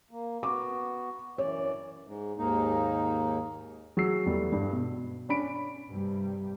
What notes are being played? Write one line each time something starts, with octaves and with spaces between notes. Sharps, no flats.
A#3
B3 F#4 D6
F#2 E3 C#5 D5
G#2
D#2 G#2 A#3 D#4
F#3 G#4 E6 C7
E2 G3 A3
G2
B2
C#4 D4 B5 D7
G2 C3 G3